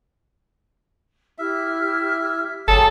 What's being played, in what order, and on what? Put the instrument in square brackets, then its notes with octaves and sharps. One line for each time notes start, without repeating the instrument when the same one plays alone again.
[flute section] E4 G4 F6 [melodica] E5
[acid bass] G1 [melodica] F#3 G#4 A5 [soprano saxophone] A4